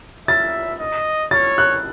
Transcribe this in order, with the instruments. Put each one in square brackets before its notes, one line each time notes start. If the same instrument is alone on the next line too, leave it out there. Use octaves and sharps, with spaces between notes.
[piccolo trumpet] E5 [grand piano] A6
[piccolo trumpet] D#5
[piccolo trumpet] C#5 [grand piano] A6
[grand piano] F#6